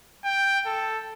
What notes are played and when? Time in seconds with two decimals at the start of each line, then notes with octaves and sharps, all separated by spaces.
0.25 G5
0.66 A4